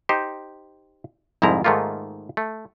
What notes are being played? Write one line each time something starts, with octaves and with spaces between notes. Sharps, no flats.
D#4 G4 C5
C2 F2 G#2 F3 E4 A#5
G#2 D#3 A3 A#3 F4
A3